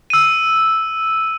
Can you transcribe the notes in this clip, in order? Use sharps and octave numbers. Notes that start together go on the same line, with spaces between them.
E6 D#7